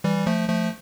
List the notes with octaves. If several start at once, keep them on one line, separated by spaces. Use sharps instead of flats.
E3 G3
F3 A3
F3 A3